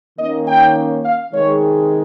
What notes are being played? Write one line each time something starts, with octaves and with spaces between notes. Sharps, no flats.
D#3 A#3 C#4 D#5
G5
F5
C3 D#3 G#3 C#5